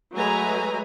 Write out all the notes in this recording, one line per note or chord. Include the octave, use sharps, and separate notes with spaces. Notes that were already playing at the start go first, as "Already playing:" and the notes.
F#3 G#3 A3 B4 G#5 A#5